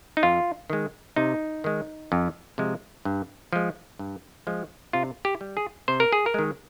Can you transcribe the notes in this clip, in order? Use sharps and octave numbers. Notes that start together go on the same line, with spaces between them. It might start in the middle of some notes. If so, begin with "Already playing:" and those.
D#4
F2 F4
D#3 G#3
C3 D#4
D#3 G#3
F2
C3 F3 G#3
G2
F3 G#3
G2
F3 G#3
C3 F4
G4
G3
G#4
C3 C5
A#4
G#4
A#4
D#3 G#3